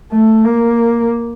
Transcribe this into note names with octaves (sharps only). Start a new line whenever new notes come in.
A3
A#3